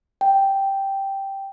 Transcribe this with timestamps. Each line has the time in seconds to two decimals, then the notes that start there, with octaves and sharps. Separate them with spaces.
0.21 G5